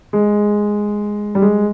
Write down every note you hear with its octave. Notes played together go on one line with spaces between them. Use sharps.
G#3
G3
G#3